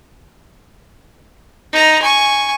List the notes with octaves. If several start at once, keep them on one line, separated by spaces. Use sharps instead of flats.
D#4 A#5
G#5 C#6